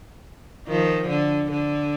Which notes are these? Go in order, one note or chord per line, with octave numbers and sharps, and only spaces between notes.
D#3 F3
D3
D3